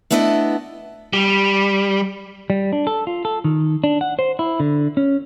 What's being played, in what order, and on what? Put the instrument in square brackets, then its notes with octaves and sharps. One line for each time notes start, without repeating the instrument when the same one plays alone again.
[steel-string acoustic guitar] A3 B3 D4 E4 C#5 D#5
[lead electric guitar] G3
[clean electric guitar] G3
D4
A4
F4
A4
D#3
D4
F#5
C5
E4
D3
C#4